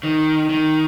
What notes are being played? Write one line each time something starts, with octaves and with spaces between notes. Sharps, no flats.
D#3
D#3